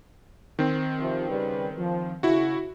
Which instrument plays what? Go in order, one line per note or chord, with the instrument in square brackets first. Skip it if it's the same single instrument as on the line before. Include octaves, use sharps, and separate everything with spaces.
[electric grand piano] D#3 C4
[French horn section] C3 F3
C#3 G3 B4
F3
[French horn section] C#3 [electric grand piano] E4 F#4